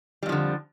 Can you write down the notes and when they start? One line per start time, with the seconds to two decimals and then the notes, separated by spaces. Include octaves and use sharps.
0.23 G3
0.26 F2
0.29 F3
0.32 D3